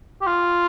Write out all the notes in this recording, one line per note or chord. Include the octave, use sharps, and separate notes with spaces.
G4
F4